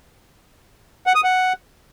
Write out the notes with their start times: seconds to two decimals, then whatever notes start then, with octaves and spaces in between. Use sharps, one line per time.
1.07 F#5
1.15 D#6
1.24 F#5